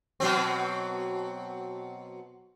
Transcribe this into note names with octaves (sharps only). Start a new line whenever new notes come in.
B2 F#3 C4